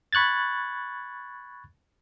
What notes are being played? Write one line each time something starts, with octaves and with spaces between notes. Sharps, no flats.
B5 C#6 F#6 G#6 A6